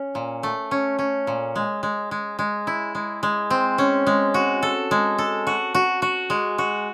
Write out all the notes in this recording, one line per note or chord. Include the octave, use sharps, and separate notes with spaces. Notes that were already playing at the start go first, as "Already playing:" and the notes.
Already playing: C#4
A#2
A3
C#4
C#4
A#2
G#3
G#3
G#3
G#3
E4
G#3
G#3
C4
C#4
G#3
F#4
A4
G#3
A4
F#4
F#4
F#4
G#3
F#4